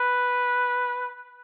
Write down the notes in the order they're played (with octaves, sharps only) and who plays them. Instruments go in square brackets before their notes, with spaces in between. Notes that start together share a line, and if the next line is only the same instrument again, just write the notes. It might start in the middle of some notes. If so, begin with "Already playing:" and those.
Already playing: [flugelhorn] B4